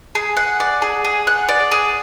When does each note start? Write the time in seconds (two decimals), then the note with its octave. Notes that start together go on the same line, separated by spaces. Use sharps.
0.15 G#4
0.37 F#5
0.60 D5
0.82 G#4
1.05 G#4
1.27 F#5
1.49 D5
1.72 G#4